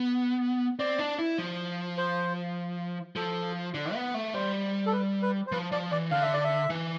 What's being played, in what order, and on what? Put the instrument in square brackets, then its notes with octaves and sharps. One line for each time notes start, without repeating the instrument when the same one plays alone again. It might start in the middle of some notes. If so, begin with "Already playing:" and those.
Already playing: [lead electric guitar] B3
[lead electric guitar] C4 [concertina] D5
[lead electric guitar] D4
E4
F3
[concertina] C5
[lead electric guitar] F3 [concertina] A4
[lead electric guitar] D3
B3
A3
[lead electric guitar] G3 [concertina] C5
[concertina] A4
B4
B4
C5
[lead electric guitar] F3 [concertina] B4
[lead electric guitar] F3 [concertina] D5
[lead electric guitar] E3 [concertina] D5
[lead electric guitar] D3 [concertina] F5
[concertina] E5
D5
E5
[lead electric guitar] E3